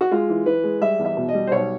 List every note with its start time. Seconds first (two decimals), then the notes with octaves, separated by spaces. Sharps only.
0.01 F#4
0.11 G#3 F4
0.29 E3
0.46 E3 B4
0.64 G#3
0.81 G3 E5
0.99 E2
1.05 E5
1.17 B2
1.29 D#5
1.34 G3
1.47 C5
1.52 B1 C#5